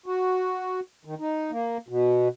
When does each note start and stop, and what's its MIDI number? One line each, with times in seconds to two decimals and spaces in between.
0.06 0.80 66
1.05 1.15 51
1.19 1.51 63
1.51 1.77 58
1.88 2.28 47